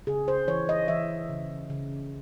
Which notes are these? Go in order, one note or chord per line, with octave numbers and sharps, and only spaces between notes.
C#3 G#4
C5
E3 C#5
D#5
E3 E5
C#3
C#3